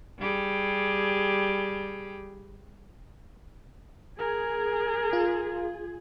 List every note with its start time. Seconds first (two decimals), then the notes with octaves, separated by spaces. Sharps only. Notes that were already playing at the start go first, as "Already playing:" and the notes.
0.19 G3 G4 G#4
4.18 G#4 A#4
5.13 F4